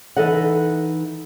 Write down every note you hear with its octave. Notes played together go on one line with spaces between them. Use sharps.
E3 D#4 A4 D#5 F#5